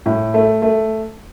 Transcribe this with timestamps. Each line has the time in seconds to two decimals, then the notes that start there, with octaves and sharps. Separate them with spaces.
0.06 A2
0.34 A3
0.62 A3